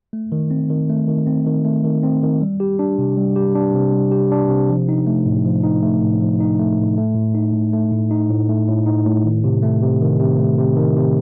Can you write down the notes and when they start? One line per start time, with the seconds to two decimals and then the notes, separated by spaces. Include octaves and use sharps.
0.13 A3
0.32 D#3
0.51 C4
0.70 D#3
0.89 A3
1.08 D#3
1.27 C4
1.46 D#3
1.65 A3
1.84 D#3
2.03 C4
2.23 D#3
2.41 G3
2.60 G4
2.79 D4
2.98 C3
3.17 G3
3.36 G4
3.55 D4
3.74 C3
3.93 G3
4.11 G4
4.32 D4
4.49 C3
4.70 F3
4.89 D#4
5.07 A3
5.26 A2
5.45 F3
5.64 D#4
5.82 A3
6.01 A2
6.21 F3
6.40 D#4
6.59 A3
6.78 A2
6.97 A3
7.15 A2
7.35 D#4
7.53 A2
7.73 A3
7.92 A2
8.11 D#4
8.30 A2
8.49 A3
8.68 A2
8.86 D#4
9.06 A2
9.25 D#3
9.44 C3
9.63 A3
9.82 C3
10.01 D#3
10.19 C3
10.39 A3
10.57 C3
10.76 D#3
10.96 C3